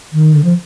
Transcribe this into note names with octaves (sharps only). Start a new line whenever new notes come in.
D#3
D3
F3